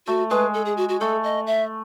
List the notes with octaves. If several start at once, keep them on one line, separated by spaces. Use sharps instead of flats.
A3 F#4
G#3 B4
A4
G#4
F#4
F#4
A3 A4
D#5
E5